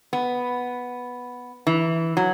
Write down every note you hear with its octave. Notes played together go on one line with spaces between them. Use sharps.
B3
E3
F#3